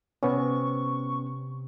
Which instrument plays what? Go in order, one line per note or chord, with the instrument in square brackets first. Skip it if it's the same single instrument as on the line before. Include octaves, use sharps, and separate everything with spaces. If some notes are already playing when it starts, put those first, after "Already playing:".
[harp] C3 [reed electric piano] B3 C#4 [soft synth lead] C#6